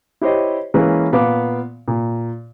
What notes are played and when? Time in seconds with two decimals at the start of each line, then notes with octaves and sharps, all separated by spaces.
0.21 E4 G4 C5 C#5 D#5
0.74 E3 G#3 A#3 C#4 B4
1.12 A#2 B3 F5 D6
1.88 A#2